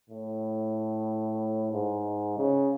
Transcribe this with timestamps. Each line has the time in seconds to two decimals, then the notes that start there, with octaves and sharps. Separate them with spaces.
0.09 A2
1.72 G#2
2.37 C#3